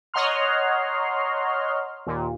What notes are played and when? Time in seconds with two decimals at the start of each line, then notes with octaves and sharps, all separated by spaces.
0.14 C#5 D#5 F#5 A#5 C6 F6
2.07 D#2 A#2